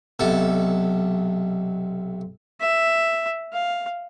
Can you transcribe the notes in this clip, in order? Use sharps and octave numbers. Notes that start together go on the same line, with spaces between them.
B1 C3 A4
E5
F5